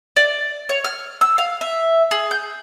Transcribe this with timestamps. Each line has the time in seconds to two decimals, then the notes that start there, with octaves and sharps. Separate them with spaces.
0.16 D5
0.69 C#5
0.84 F6
1.21 E6
1.38 F5
1.61 E5
2.11 G#4
2.31 G6